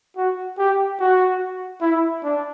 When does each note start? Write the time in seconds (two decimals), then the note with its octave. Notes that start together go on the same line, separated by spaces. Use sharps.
0.17 F#4
0.58 G4
1.00 F#4
1.81 E4
2.24 D4